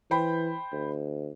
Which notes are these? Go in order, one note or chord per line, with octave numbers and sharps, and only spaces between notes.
E3 C5 G5 B5
D2